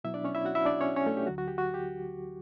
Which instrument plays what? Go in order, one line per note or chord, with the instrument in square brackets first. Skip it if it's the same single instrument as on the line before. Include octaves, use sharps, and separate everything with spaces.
[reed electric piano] B2 F#3 B3 E4 E5
D4 D5
C#4 C#5
E4 E5
F#4 F#5
E4 E5
D4 D5
C#4 C#5
C#4 C#5
A3 A4
G4
D2 D3 F#3 F#4
F#4
G4
F#4
G4